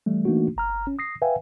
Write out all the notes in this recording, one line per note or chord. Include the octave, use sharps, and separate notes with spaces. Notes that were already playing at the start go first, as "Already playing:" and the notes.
E3 G3 A3
E3 A3 A#3 D4 D#4 F#4
G1 A#5 F6
C#4
D#6 A#6 C7
B4 E5 F5 G5 G#5